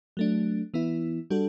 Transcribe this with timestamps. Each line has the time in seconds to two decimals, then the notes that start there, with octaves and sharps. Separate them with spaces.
0.17 F#3 A3 D4
0.74 E3 B3 E4
1.30 G3 D4 F#4 A4